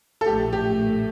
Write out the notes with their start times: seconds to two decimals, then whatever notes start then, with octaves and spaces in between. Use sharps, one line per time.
0.21 A4
0.26 A#1 A2 A3 G4
0.53 G4